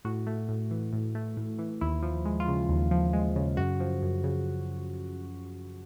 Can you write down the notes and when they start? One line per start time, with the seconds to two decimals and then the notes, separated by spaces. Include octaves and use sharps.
0.05 A2 F#4
0.27 A3
0.49 A2
0.71 E3
0.93 A2
1.15 A3
1.37 A2
1.59 E3
1.81 D#2 E4
2.03 F3
2.25 G#3
2.40 F4
2.48 C#3
2.69 D#2
2.91 F3
3.13 G#3
3.36 C#3
3.57 F#2 F#4
3.80 F3
4.02 F#2
4.24 C#3